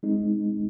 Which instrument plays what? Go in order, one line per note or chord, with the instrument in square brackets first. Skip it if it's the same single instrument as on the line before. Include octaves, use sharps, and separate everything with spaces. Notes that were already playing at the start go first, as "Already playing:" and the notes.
[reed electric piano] G#3 C4 D#4